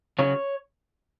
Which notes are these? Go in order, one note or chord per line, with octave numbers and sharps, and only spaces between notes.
C#3 F#3 C#4 C#5